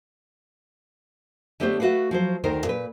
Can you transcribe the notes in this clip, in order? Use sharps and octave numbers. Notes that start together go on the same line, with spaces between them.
D3 A3 B3 G4 C5 C#5
A3 F#4 B4 F5 F#5
F3 F#3 C5
D2 D#3 A#4 C5
A#2 B4